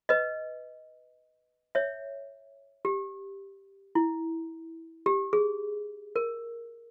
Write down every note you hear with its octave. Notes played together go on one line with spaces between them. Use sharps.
B4 D#5
C#5 E5
G4
E4
G4
G#4
A#4